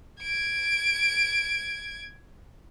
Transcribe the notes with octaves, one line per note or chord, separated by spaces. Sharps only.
G#6 D7